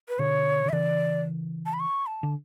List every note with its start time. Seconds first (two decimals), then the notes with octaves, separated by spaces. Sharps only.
0.09 B4
0.19 B2 D3 C#5
0.65 D3
0.69 E5
0.72 C#3 E3 D5
1.66 A5
1.73 B5
1.80 C#6
2.06 A5
2.23 D3